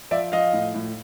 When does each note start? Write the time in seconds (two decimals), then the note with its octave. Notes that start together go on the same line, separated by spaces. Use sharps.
0.11 F3 D5 E5
0.32 F3 D#5 F5
0.53 A2
0.74 A2